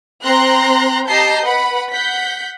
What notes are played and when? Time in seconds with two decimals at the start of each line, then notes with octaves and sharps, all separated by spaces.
0.23 C4 A#5 C6 F#6
1.08 G4 D#5 A5 A#5 G6 C7
1.44 B4 F#5 B5
1.91 F#5 G6 B6